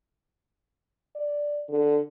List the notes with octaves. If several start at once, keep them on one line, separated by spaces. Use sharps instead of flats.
D5
D3